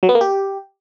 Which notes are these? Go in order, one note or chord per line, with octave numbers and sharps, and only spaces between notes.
F#3
B3
A#3
G4